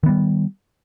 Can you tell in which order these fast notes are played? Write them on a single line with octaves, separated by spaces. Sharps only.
D#3 B3 G3